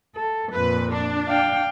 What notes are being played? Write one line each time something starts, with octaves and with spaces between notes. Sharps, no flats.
A4
F2 A#2 B4
D4
F5 G5